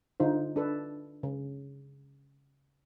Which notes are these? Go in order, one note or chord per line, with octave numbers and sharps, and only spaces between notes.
D3 D#4 F4 C5
D4 A4 B4
C#3